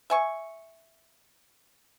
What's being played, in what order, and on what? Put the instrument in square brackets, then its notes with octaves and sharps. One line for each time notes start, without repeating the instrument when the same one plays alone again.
[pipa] E5 G#5 C#6